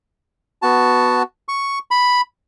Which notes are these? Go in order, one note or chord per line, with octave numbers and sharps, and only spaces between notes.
B3 F#4 A5
C#6
B5